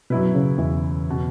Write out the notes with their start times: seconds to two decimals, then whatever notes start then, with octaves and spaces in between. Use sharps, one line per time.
0.10 F#2 B2 F#3 E4 B4
0.35 C#3
0.58 E2 E3
1.10 B2